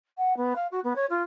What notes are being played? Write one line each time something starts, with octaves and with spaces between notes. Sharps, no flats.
F#5
B3
F5
F#4
B3
C#5
F4